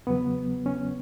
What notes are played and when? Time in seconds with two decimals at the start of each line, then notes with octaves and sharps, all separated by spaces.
0.07 E2 C#3 F#3 B3
0.66 C#4